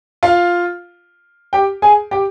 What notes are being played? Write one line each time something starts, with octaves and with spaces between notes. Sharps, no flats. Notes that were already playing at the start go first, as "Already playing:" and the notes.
F4 F5
G4 G5
G#4 G#5
G4 G5